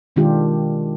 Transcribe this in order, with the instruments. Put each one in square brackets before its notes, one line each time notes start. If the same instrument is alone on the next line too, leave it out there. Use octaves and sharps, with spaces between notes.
[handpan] B2 D#3 G#3 D4 F4 G4